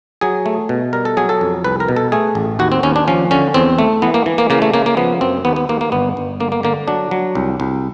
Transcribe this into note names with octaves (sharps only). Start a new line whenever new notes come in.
F#3 G#4
A3
B2
G3 A#4
A4
F#3 G#4
A4
F2
C2 B4
A#4
B2
A4
A3 G#4
A1
D#2 F#4
C4
D#2 C#4
D4
F3 C#4
D3 C#4
E2 C4
A3
E3 B3
A#3
E3
A#3
C#3 A#3
A3
C#3 A#3
A#3
F3 B3
F#2 C4
D#2 B3
B3
D#2 A#3
A#3
G1 B3
G1
D3 A#3
A#3
D3 A#3
F#3 D4
F#3
C2
C2